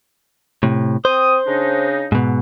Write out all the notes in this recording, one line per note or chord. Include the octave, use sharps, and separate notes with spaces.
A2 C3
C4 C5 D#6
C#3 D4 D#4
G#2 B2